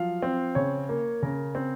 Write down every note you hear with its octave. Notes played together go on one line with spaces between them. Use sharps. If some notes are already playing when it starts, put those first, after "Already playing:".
Already playing: F3 F#3 F5
C4
C#3 C#5
A#3
C#3 A#4
C4